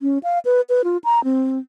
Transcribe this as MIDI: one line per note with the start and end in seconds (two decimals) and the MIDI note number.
0.02 0.18 61
0.23 0.39 77
0.45 0.61 71
0.69 0.82 71
0.84 0.97 65
1.04 1.23 82
1.24 1.59 60